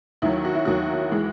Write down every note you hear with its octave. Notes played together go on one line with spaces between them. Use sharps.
D#2 D#3 F#3 E4
F#4
E4
D#2 D#3 F#3 F#4
E3 G#3